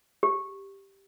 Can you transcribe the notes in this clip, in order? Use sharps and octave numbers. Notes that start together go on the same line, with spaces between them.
G4